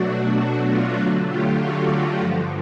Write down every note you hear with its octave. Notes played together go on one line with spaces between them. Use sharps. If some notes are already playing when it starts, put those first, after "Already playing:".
Already playing: B2 F#3 A3 D4 F#4
F#4
F4
D3 F#3 A3 F#4
F4 G4
F#4
G2 D3 F3